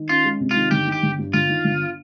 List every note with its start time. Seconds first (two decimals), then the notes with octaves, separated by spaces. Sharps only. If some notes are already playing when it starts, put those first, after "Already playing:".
Already playing: D#3
0.09 C#4 F4
0.24 G#3
0.40 C3
0.51 D#3 F4
0.71 G1 G4
0.87 D#3
0.92 G4
1.03 G1
1.19 G2
1.33 G1 F4
1.49 D#3
1.65 G1